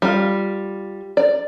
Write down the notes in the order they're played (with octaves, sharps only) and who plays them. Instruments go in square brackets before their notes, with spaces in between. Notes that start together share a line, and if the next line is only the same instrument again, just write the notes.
[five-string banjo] G3 F4
D5